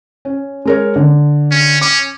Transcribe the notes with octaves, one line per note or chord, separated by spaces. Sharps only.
C#4
G#3 A#4 C#5
D3
C#4
C#4 D6